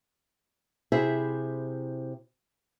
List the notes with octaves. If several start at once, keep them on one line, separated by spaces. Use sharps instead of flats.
C3 E4 G#4 C5 E5